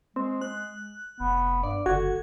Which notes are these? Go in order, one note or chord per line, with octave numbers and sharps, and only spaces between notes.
G#3 C4
F#6
F1 B3
G2 D5
F#1 D3 F#4 G#6